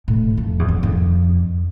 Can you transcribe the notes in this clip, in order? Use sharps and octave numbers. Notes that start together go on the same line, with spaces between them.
A2
F2
E2
F2
F2